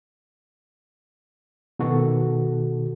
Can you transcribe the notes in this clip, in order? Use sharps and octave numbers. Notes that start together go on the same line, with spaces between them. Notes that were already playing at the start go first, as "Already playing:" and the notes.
B2 D#3 F#4 A4